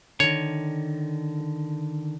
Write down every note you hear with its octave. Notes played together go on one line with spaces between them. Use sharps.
D3 D#3 C#5